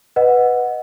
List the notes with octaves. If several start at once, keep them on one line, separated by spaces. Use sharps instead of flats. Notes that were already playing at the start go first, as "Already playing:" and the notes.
B4 D#5 F#5